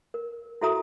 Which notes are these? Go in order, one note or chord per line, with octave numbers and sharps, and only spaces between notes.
A#4
E4 F#4 A4 E5 A#5 D#6